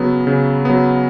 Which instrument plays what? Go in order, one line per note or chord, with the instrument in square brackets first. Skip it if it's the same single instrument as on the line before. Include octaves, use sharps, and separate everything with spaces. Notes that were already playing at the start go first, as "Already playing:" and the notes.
Already playing: [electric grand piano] C#3 F#3 B3
C#3
F#3 B3